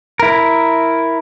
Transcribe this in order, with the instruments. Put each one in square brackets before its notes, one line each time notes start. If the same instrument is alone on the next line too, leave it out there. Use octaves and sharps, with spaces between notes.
[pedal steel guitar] E4 A#4